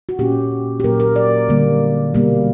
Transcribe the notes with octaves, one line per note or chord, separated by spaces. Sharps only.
F#4
A#2 A#3 C#4 G4
G4
A#2 F#3 A#3 A#4
A#4
D5
D3 G3 A#3
B2 G3 A#3